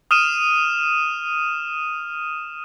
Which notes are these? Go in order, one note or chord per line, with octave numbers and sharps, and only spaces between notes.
D#6 F6 D#7 E7